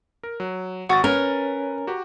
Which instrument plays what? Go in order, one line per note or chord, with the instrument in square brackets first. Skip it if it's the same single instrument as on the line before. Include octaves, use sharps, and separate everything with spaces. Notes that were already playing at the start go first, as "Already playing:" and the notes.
[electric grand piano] A#4
F#3
[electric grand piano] G#1 C#6 A6 [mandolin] F#4
[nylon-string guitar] C#4 [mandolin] A#4 [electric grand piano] B4
[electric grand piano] F#4 G4